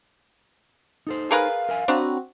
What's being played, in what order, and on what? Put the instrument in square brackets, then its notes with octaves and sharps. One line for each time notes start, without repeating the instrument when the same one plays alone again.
[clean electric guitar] D#4 A4 C5
[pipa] G#4 A#4 B4 [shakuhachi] F5
[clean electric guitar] A#4 E5 G#5
[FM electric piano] C4 F#4 [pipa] D4 [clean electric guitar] C#5 A#5 B5